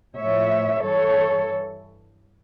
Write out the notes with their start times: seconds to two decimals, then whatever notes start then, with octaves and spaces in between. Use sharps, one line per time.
0.17 A2 F3 C#5 E5
0.82 G2 E3 A4 C#5